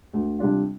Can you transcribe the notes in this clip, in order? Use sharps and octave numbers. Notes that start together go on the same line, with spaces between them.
D2
C3 G3 D4 F4